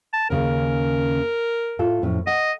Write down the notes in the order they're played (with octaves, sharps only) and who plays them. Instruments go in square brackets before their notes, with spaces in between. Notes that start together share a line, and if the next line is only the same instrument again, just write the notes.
[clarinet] A5
[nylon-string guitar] D#2 C#3 [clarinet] A#4
[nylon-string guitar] A2 F4 A4
F2 A2 C#4
[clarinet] D#5 [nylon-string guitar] F#5